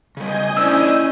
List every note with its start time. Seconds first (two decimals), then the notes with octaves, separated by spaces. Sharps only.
0.17 C#3 G3 D#5 G#5 G6
0.57 C#4 D4 E4 C5 D5 E6